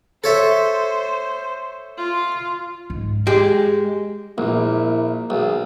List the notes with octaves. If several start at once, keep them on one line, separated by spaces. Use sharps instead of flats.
A4 C5 C#5 E5
F4
G#2
G#3 G4
A#1 A#3 E4
B1 G#4